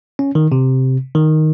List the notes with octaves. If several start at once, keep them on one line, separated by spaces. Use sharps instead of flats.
C#4
D#3
C3
D#3